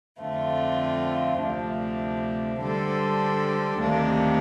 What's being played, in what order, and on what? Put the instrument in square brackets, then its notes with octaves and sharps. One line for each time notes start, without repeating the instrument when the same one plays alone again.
[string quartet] F2 D3 A3 C4 F4
D2 C3 F3 A3 D4
D3 G3 D4 A4 C5
D2 C3 D#3 A#3 D4